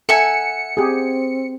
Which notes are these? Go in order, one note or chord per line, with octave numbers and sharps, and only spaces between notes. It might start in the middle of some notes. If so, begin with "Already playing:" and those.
A4 E5 F#5 G#5 C#7
C4 G4 G#4